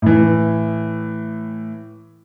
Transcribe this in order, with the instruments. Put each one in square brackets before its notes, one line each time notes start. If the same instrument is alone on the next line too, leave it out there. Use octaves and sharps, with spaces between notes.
[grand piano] A2 E3